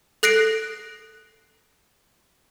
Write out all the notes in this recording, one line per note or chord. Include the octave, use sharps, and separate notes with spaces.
A4 F#6 A#6 C7 D7